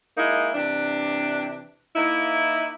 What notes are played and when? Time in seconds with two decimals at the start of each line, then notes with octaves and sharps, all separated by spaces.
0.17 G#3 A#3 D#4 E4
0.55 C3 E3 D4
1.96 A#3 D#4 E4